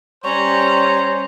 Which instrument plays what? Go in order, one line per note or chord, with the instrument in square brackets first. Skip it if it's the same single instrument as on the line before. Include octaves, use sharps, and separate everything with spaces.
[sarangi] G3 [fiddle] C#4 A#5 [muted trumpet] C5 [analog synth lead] C#5